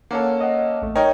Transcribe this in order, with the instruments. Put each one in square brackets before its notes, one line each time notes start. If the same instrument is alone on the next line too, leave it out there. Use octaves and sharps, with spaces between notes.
[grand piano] A#3 C#4 A4 [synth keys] F#5
[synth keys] D#5 F#5
A1 A3
[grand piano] D#4 A#4 C#5 [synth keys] G5